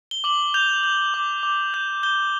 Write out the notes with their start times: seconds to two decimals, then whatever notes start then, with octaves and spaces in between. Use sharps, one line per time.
0.11 G7
0.24 D6 F#7
0.54 G6 F7
0.83 G6
1.14 D6
1.43 D6
1.74 G6
2.03 G6 G7